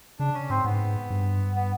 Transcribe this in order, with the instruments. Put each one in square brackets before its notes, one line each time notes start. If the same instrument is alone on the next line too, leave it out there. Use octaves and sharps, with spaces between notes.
[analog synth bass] C#3 [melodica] D4
[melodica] C#4
[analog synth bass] G#2 [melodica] C4
[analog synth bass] G#2 [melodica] B3
[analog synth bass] G2
[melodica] B3